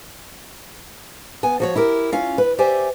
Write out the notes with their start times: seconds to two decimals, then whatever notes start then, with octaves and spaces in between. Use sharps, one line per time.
1.43 B3 G#5
1.60 F3 F#4 C#5
1.76 E4 G4 A#4
2.12 C#4 F4 F5
2.38 B4
2.58 G4 C5 D5 E5 G#5